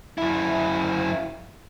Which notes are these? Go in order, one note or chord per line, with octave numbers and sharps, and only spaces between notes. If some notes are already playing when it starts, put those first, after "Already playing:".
F#2 E4